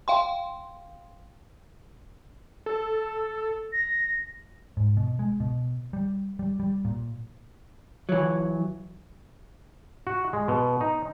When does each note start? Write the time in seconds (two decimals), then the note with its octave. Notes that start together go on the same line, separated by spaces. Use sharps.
0.08 F5 G5 C6
2.66 A4
3.72 A#6
4.77 G#2
4.97 B2
5.19 G#3
5.40 B2
5.93 G3
6.39 G3
6.60 G3
6.85 A#2
8.09 E3 F#3
10.07 F#4
10.33 G#3
10.48 B2
10.81 D#4